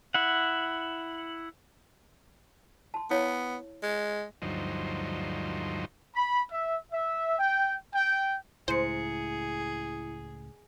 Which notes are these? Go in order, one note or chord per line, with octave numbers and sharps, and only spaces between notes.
E4 F#5
A5 C6
B3 E4 C#5 F5
G#3
D2 G2 F3 F#3 D#4 C5
B5
E5
E5
G5
G5
C#2 A2 E4 G#4 C5 C#7